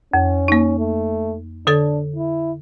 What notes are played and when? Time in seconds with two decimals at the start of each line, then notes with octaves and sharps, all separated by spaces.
0.13 F2 C#4
0.48 A#3 D#4
0.78 A3
1.67 D3 D4 A4 A6
2.16 E4